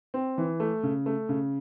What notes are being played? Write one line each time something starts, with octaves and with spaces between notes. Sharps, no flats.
C4
E3
A3
C#3
A3
C#3